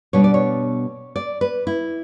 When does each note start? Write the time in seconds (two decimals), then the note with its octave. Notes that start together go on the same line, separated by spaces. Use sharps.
0.13 B2 G3 B3 D4 C#5
0.24 D5
0.34 C#5
1.16 D5
1.41 B4
1.67 E4